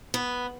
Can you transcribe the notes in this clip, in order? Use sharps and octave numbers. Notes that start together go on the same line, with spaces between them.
B3